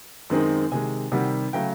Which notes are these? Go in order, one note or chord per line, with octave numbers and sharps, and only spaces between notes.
F#2 D#3 G#3 C4 D#4
C3 D#3 G#3 G#5
C3 D#3 G3 F#5
C#3 F#3 A3 G5